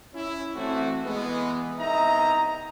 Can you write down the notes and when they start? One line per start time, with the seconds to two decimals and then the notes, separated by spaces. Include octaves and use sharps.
0.14 C#4 E4
0.55 E3 A3 C4 F#4
1.05 E3 G#3 B3
1.79 C2 B3 D#4 D#5 E5 A#5